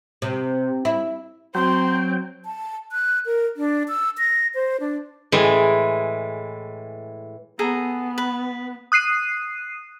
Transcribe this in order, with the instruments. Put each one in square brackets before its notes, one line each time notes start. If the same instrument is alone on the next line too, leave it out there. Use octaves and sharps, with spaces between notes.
[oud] C3
E4
[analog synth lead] F#3 [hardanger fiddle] C4 [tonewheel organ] G5 [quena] C6
[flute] A5
F#6
A#4
D4
E6
A#6
C5
D4
[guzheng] A2 E3 G#3
[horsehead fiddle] B3 [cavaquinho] G#4 A4 A#5
[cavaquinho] B4
[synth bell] D#6 F#6 C7 D#7